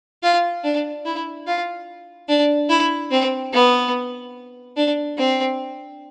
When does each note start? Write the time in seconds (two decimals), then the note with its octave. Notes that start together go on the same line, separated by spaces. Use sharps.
0.23 F4
0.64 D4
1.05 E4
1.47 F4
2.29 D4
2.70 E4
3.11 C4
3.53 B3
4.76 D4
5.17 C4